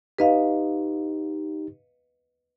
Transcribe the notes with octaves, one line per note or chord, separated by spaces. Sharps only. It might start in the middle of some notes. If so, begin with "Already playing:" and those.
D#4 G4 B4 D#5 F5